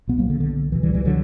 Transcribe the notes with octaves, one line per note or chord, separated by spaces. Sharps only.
B1 B2 B3
F#3 A#3
D3
D3
C#2 B2 E3
E3 G3
E3 G3
D3 F#3